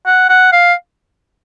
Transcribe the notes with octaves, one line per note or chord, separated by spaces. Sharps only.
F#5
F#5
F5